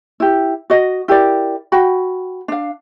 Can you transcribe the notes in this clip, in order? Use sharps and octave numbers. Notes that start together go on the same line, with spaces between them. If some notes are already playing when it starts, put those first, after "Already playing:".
E4 G4
F#4 D#5
E4 G4 A#4 D5
F#4 G5 B5
D4 F5